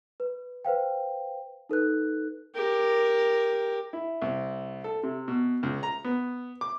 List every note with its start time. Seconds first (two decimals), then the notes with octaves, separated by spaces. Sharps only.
0.20 B4
0.65 B4 C5 F5 G5
1.69 D#4 A4 B4 F#6
2.55 G4 A#4
3.93 E4
4.22 C2
4.84 A4
5.03 C3
5.28 B2
5.63 C#2
5.83 A#5
6.04 B3
6.61 D6